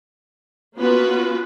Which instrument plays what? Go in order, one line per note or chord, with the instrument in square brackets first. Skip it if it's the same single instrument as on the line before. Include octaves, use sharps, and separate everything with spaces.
[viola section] A#3 B3 C#4 F4 F#4 B4